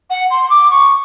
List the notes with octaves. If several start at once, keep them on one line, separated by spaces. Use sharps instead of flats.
F#5
C6
D6
C#6